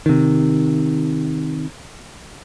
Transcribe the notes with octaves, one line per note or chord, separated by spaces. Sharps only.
C3 D#3